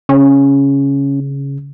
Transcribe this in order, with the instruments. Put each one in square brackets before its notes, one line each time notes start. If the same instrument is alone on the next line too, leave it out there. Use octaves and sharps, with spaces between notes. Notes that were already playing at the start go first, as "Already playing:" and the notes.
[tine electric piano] C#3 [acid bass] C#4